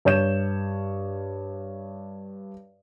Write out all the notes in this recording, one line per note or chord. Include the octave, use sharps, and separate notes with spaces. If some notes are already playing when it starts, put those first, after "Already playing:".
G2 C#5 G6 E7